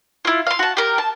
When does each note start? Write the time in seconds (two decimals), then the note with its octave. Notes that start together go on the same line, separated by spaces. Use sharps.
0.25 E4 F4
0.47 F5 C6
0.59 F#4 A5
0.77 G4 A#4
0.98 A5